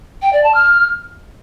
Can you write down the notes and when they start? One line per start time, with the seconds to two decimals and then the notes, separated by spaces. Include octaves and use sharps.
0.22 G5
0.33 D5
0.43 A5
0.54 F6